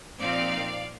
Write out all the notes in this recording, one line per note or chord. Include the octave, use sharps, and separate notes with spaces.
A#2 F3 C4 D#4 D5 F5